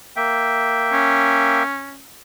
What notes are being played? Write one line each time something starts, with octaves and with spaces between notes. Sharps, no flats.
A#3 E5 G5
C#4